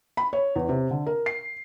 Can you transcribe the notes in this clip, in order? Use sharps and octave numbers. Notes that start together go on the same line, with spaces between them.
B5
C#5
E2
C3
D3
A#4
C7